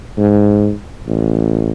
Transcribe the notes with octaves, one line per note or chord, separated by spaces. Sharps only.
G#2
A1